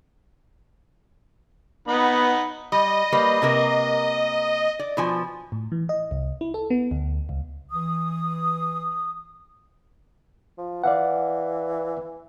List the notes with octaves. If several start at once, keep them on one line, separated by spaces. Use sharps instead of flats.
B3 D#4 F#5 B5
G3 D#5
G3 A#3 B4
C3 A#3 A#4
D5
B2 F3 G#5
A2
E3
D#5
C2
E4
A4
B3
D2
C#2
E3 D#6
F3
E3 D5 F5 F#5